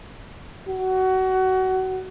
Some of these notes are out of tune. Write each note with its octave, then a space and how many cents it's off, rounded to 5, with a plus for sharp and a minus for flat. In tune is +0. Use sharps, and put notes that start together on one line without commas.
F#4 +25